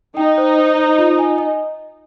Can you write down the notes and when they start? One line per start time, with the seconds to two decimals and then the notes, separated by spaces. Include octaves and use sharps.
0.16 D#4 G5
0.38 C5
0.58 C5
0.79 C5
0.98 F4
1.19 G#5
1.38 D#5